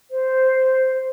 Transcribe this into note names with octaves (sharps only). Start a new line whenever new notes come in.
C5